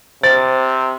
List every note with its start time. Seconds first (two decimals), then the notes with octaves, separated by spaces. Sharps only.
0.23 C3 C5 A6